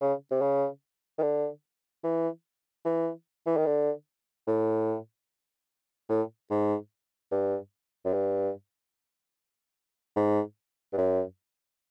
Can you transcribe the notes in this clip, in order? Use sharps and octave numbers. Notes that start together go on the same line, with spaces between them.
C#3
C3
C#3
D#3
D3
E3
E3
E3
D#3
D3
A2
A2
G#2
G2
F#2
G2
G#2
G2
F#2